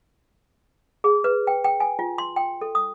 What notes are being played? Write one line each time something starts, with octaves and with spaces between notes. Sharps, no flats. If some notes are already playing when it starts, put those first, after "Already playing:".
G#4
B4
G5
G5
G#5
F4
C6
G5
A4
D#6